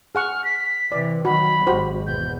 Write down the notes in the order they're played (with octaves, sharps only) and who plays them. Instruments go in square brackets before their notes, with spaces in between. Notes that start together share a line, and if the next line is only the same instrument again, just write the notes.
[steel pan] G#4 F#5 C#6 [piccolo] F6
[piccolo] B6
[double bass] C3 E3 [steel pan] D5
[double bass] D#3 F#3 [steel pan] F#4 [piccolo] B5
[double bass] G#1 [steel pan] F#4 G4 C5
[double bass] E2 B2 [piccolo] G6